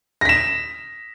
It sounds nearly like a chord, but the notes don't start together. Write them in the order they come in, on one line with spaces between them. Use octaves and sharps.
A#6 B6 E7